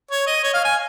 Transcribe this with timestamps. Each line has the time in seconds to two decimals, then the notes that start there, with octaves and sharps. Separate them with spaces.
0.11 C#5
0.27 D#5
0.43 C#5
0.54 F5
0.64 G#5